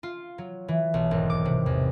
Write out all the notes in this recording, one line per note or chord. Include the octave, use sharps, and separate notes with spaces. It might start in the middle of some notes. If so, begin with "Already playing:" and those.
F4
F#3
E3
B1
G#1
D6
C3
E2